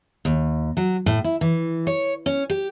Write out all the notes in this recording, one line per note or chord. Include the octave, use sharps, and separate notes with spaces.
D#2
F#3
A2
E4
E3
C#5
C#4
G4